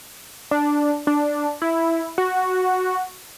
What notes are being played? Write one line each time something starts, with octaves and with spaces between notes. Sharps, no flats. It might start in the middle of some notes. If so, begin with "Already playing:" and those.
D4
D4
E4
F#4